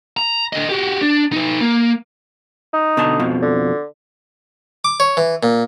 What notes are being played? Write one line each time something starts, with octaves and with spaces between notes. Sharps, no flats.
A#5
D3 D#5
F#4 G4
D4
D#4 B4
A#3
D#4
B2 D3 A5
F2 B2 F3
D3
D6
C#5
E3
A#2